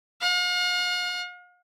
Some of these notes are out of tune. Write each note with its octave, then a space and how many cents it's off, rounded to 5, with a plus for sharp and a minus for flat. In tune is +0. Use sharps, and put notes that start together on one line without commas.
F5 +45